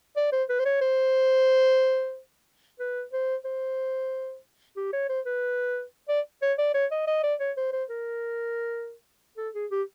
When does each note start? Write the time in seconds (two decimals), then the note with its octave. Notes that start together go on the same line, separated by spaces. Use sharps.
0.17 D5
0.32 C5
0.49 B4
0.59 C5
0.65 C#5
0.81 C5
2.79 B4
3.13 C5
3.45 C5
4.77 G4
4.93 C#5
5.09 C5
5.26 B4
6.09 D5
6.42 C#5
6.58 D5
6.74 C#5
6.91 D#5
7.07 D#5
7.23 D5
7.40 C#5
7.57 C5
7.73 C5
7.90 A#4
9.37 A4
9.54 G#4
9.71 G4